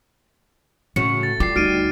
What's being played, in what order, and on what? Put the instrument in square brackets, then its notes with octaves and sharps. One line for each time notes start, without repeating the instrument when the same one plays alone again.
[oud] A2 C#4 F#4 [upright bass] C#3 [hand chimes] C#7
[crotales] A6
[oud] G3 [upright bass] F4 [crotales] D6 C7
[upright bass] D2 [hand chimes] D#4 F#4 [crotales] F6 D7 D#7